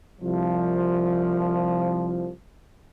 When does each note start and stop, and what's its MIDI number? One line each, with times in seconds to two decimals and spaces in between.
0.22 2.30 36
0.22 2.30 53